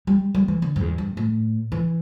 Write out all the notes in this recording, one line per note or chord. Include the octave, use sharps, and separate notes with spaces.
G3
G3
E3
D3
G2
E2
G2
A2
E3